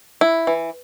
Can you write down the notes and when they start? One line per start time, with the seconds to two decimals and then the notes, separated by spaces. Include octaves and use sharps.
0.21 E4
0.47 E3